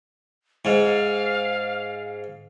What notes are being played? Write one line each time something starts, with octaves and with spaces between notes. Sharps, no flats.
G#2 F5